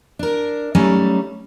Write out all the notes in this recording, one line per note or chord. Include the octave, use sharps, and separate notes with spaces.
D4 A#4
F#3 G3 A3 C#4 D#4